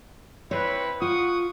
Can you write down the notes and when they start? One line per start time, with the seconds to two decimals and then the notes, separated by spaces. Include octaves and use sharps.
0.51 C4 E4 B4 C#5
1.02 F4 F#5 C#6 D#6